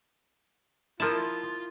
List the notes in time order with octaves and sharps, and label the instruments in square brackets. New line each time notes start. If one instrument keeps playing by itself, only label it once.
[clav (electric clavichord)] F3 A5 [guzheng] E4 A#4 [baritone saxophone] F4